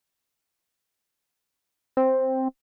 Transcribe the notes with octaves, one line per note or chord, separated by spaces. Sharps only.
C4